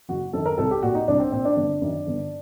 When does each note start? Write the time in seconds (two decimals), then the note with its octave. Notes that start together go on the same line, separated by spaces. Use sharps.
0.09 F#1 F#4
0.33 F#2 D#3 A4
0.46 A#4
0.58 C2 A4
0.71 G4
0.82 A#2 F#4
0.95 D#4
1.08 C2 D4
1.19 C4
1.32 A#2 C4
1.45 D4
1.56 G1
1.82 F#2 D#3
2.07 G1